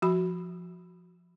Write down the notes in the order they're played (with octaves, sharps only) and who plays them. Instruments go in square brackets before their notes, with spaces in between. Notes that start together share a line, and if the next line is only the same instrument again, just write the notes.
[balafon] F3 F#4 B5